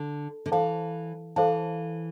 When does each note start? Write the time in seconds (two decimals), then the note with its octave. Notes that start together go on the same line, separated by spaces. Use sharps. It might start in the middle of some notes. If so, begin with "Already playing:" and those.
Already playing: D3
0.46 D3
0.52 E3 A4 C5 F5 A5
1.36 E3 A4 C5 F5 A5